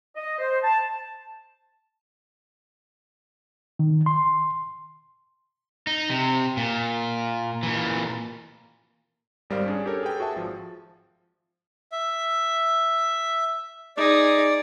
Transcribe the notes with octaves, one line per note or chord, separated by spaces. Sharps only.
D#5
C5
A5
D#3
C6
D#4
C3
A#2
A#2 E3
G#1 G3 A#4 C5 F5
C#4 D4 G#4
G4 A4 A#4 C#5
G#4 A4 B4 G5
F#4 G#4 E5 A5
G#1 F3
E5
D#4 G#4 D5